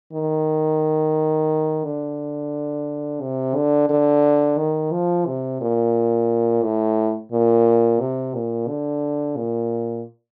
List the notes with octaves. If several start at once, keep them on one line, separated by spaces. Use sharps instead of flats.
D#3
D3
C3
D3
D3
D#3
F3
C3
A#2
A2
A#2
C3
A#2
D3
A#2